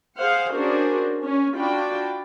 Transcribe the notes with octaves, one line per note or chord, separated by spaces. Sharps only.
G#4 C5 F5 F#5
C#4 D4 F#4 G#4 A#4 C5
C#4
D4 F4 F#4 D5 G5 B5